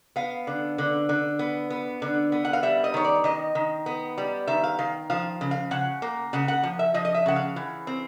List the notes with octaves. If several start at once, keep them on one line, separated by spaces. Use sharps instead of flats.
B3 F5
D3
D3
D3
B3
B3
D3
B3
F#5
F5
G3 E5
D#5
D#3 C#5
D5
D#3 D#5
D#3
B3
G3
D#3 E5
F5
D#3 F5
F3 F5
C#3
F5
C#3 F#5
A#3
C#3 F#5
F#5
F3
E5
F3 D#5
D#5
E5
C#3 F#5
F5
E3
C4